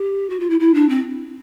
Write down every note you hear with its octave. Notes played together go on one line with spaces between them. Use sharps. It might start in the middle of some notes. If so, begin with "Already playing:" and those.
Already playing: G4
F#4
F4
E4
E4
D4
C4